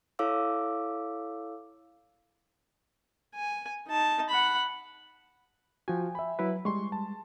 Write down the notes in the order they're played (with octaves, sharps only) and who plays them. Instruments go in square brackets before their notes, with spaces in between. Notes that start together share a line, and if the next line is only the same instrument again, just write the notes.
[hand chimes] E4 A4 C#5 F5 D6 E6
[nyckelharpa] G#5
D#4 A5
F#5 B5
[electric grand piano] F3 F#4 [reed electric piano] G5 G#5
[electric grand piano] E5 B5
[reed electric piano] F#3 E4 B4
[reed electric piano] G3 G#3 [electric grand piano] C6 C#6
[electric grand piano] A5